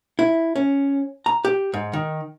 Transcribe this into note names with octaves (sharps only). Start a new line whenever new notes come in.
E4
C#4
A#5
G4
G#2
D#3